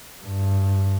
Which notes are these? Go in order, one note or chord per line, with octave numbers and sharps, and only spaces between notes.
G2